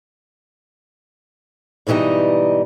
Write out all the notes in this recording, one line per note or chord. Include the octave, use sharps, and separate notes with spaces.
G#2 B2 E3 G3 D#4